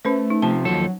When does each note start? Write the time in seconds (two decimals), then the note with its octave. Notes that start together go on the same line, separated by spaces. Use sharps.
0.05 A3 C#4 B4 C5
0.30 D#4
0.42 C3 F3 A5
0.65 D#2 F3 F#3 A4